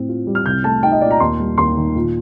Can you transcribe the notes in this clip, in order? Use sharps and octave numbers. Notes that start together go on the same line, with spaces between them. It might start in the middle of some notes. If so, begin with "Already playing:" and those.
Already playing: A2 C4
F4
G3
F6
C2 G6
A3 A5
D#4 G5
D#5
A#2 D5
A#5
D#2 C6
G3
D#2 C6
D#3
A#2